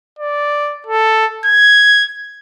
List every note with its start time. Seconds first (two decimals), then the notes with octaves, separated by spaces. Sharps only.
0.19 D5
0.87 A4
1.46 G#6